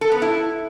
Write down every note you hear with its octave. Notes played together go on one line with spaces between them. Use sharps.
A4
B3
E4